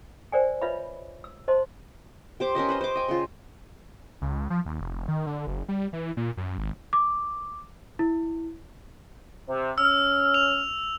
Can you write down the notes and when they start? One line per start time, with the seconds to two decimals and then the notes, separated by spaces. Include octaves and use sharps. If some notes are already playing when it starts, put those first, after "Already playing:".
0.32 A#4 C5 D5 G5 G#5
0.61 F4 B4 C#5 D#5 E5 B5
1.24 E6
1.48 C5 D#5 A5 C6
2.40 G4 C5 D6
2.55 C#4 A#4 C5 D#5
2.69 B4 C5 D#5
2.81 C5 D6
2.95 D#5 G5 G#5
3.08 C#3 F4
4.22 C#2
4.50 F3
4.66 D#2
4.81 F1
5.08 D#3
5.27 D3
5.47 F#1
5.68 G3
5.93 E3
6.17 A#2
6.37 F#2
6.58 G#1
6.93 D6
7.99 E4
9.49 C3
9.78 C#4 E6 F6
10.34 F7